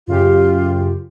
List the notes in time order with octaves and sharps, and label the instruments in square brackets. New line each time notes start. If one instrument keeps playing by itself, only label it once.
[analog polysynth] F#2 C#3 G4 [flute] F4